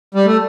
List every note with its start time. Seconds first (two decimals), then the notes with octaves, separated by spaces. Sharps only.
0.15 G3
0.26 A3